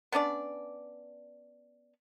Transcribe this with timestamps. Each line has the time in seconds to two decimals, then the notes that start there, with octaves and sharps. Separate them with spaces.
0.12 B3 C#4 D4 D5